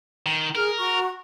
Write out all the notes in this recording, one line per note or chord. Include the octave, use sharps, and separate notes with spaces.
D#3
G#4 A#4 F6
F#4 C#6